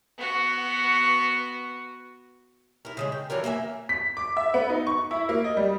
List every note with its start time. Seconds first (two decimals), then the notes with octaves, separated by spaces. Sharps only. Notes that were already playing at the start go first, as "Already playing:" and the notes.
0.18 B3 F#4
2.85 E4 A#4
2.97 C#3 F#3 G#3
3.12 G5
3.30 E3 F#3 D4 A#4
3.44 A#3 A#4 E5 G#5
3.89 B6
4.17 D6
4.37 E5
4.54 B3
4.70 D#4
4.87 C#6
5.11 E4
5.29 A#3
5.44 D#5
5.57 G3